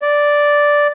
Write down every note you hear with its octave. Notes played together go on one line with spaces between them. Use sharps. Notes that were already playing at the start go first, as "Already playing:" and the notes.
D5